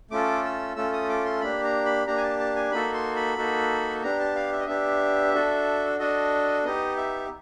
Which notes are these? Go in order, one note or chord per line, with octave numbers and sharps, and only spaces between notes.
A3 C#4 F4 A4 D6
E6
A3 C#4 F4 A4 E6
D#6
D6
C6
A#3 D4 G4 B5
A#5
B5
A#3 D4 G4 A#5
G#5
A5
A5
G#5
A#3 D#4 F#4 A4 B5
C6
B5
A#3 D#4 F#4 A4
B3 D4 G4 A#5
A5
F5
E5
D#5
B3 D4 G4 E5
D4 F#4 A4
D4 F#4 A4 D#5
B3 D#4 G4 D#5
E5